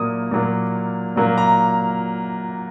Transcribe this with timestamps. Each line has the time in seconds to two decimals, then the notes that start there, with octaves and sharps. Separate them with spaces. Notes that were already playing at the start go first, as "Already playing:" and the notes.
Already playing: A#2 F#3 A#3 D#6
0.31 A#2 F#3 A#3
1.16 A#2 F#3 A#3
1.38 A#5